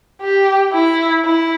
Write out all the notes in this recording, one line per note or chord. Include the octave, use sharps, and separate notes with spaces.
G4
E4
E4